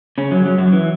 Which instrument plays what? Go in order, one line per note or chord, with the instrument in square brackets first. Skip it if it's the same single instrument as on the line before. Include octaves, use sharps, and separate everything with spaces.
[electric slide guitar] C#3 C#4
F#2 F#3
F#2 F#3
F#2 F#3
E3